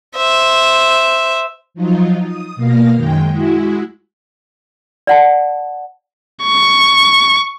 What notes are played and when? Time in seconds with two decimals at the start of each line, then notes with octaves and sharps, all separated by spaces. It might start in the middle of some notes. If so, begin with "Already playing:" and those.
0.16 C5 E5
1.74 F3 F#3 D#4 F4
2.24 D#6
2.56 B2 A#3 F5 A#6
2.95 F#2 D#3 G#3 G5
3.31 G#3 E4 F#4
5.07 D5 F#5 A5
6.43 C#6